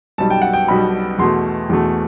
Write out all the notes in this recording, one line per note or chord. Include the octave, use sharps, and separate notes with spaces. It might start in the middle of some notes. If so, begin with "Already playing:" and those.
B1 B2 G3 A5
G5
F#5
G5
B1 B2 G3 B5
E2 B2 A3 C6
E2 B2 A3